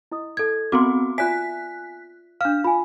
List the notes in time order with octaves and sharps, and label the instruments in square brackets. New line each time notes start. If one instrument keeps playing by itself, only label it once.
[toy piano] E4 D#5 D#6
[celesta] A4 G#6
[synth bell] B3 C4 F#4 [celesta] C6 D6
[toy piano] F4 D5 E5 [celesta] G#5 [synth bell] F#6 B6
[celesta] D4 F6 [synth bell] F5
[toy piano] F4 G#5 [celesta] B5